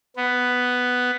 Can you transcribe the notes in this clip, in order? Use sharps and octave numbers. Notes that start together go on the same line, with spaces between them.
B3